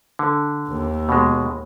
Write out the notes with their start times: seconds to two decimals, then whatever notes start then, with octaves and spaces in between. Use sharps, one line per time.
0.19 D3
0.68 D#2
1.09 B2 G#3